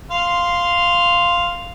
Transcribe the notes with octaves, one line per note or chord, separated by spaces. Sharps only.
F5 C6